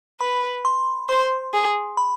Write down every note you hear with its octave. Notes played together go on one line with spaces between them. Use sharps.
B4 B5
C6
C5 C6
G#4
B5